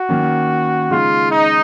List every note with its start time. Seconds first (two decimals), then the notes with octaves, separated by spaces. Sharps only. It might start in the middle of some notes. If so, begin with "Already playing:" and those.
Already playing: F#4
0.09 D#3 A#3 C#4
0.90 C#3 G#3 D#4 F4
1.32 D#4